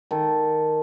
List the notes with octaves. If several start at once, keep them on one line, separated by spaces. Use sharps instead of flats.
D#3 A4